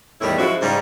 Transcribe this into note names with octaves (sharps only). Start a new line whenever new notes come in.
E2 A2 D#3 G3 E4
F#2 F3 G#3 E4 F#4
G#2 C#3 G3